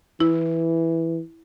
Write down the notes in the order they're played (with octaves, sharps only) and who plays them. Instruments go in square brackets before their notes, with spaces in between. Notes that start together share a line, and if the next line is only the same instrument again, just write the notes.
[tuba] E3 [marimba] E4